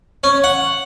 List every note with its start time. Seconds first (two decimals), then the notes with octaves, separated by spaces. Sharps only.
0.24 C#4
0.44 F#5